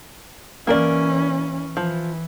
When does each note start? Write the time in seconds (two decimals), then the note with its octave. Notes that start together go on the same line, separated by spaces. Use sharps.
0.67 E3 A#3 C#4 A#4 D5
1.77 E3 F3